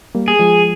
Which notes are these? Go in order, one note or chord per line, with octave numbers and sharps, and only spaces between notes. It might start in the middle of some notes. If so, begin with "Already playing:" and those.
G3 A#3
G#4
F3 G#3